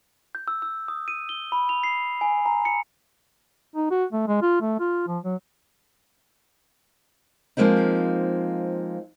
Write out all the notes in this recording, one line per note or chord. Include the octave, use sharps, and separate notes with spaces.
G6
E6
E6
D#6
D#7
G7
B5
F7
C7
G#5
A#5
C#7
D#4
F#4
A3
G#3
F4
A3
F4
F3
F#3
F3 G#3 A#3 C4 D#4